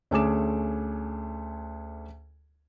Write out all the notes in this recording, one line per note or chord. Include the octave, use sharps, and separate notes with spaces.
D2 A3 C#4 G#4 D6 E7